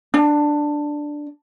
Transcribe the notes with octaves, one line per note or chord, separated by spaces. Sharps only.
D4